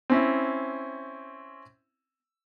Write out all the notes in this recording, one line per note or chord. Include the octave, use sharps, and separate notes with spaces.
C4 C#4 E4